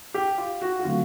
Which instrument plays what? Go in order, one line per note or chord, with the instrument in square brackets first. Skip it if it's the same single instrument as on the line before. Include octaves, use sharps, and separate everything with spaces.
[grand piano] G4
F4
F#4
F#4
[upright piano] D3 F#3 A3 C4 [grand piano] F4